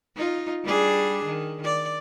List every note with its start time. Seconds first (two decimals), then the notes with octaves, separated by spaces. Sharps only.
0.16 D#4 F4
0.64 G3 D4 G#4
1.25 D#3
1.64 D5